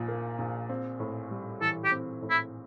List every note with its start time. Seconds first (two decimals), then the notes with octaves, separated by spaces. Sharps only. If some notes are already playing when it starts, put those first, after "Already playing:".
Already playing: A#1 A#2 F3
0.08 A#3
0.39 A#1
0.69 C4
1.00 A2
1.31 G3
1.61 E3 A4
1.84 G4
1.92 C4
2.22 A2
2.30 E4